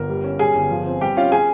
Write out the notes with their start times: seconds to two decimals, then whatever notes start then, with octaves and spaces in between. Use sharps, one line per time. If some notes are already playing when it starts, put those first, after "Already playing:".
Already playing: G1 A#4
0.09 G3
0.24 C#4
0.39 G3 G#4 G#5
0.55 G1
0.70 F3
0.86 C4
1.01 G3 G4 G5
1.17 C#4 F4 F5
1.32 C#4 G#4 G#5